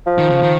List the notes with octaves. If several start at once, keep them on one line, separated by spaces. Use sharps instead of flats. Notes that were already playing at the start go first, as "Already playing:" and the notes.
F3
D#3
C#3
D#3